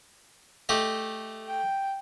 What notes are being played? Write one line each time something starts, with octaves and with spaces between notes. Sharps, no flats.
A3 G4 D#5
G5